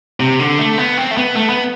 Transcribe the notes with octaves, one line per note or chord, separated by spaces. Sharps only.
C3
D3
A3
B3
C4
A3
B3
A3
B3